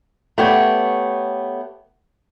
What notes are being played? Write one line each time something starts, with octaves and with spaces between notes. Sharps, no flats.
A3 B3 G4 C#5